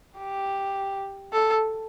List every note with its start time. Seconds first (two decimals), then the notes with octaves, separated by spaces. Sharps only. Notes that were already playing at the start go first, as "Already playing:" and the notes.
0.18 G4
1.33 A4